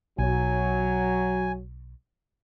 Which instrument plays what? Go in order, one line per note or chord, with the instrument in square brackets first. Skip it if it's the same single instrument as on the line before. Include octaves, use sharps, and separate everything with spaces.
[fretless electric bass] B1 [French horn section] F#3 [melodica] G#5